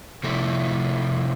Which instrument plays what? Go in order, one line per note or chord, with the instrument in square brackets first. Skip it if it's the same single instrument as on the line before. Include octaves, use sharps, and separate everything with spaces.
[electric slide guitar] C3 F3 A3 E4 A4